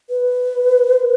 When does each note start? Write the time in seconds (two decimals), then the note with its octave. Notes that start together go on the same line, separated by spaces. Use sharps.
0.10 B4